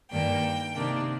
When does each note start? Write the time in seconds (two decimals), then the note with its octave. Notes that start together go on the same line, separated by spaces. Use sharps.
0.11 G2 D#3 A#3 D4 G5
0.75 C3 D#3 A#3 D4